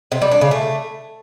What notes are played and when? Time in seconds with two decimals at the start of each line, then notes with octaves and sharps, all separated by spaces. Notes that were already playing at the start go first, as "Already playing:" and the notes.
0.12 C3
0.22 G3
0.31 D4
0.41 C#3
0.51 A3